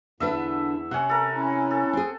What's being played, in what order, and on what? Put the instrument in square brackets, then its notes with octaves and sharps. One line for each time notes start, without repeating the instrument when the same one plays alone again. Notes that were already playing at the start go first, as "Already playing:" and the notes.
[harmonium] E2 [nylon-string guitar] D3 D4 B4 [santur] E5
[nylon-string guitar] C3 [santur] C#4 F#5
[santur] A4 A#4
[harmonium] C#4 E4
[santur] A4
[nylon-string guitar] C4 G#4